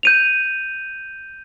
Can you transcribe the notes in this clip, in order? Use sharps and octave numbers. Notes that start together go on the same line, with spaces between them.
G6 D#7 F7